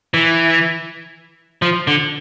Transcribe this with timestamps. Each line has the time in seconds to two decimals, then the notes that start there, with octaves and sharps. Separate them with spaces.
0.14 E3
1.62 F3
1.87 D3